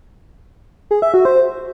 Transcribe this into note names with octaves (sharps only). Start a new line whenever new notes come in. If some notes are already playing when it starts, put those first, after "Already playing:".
G#4
E5
F#4
C5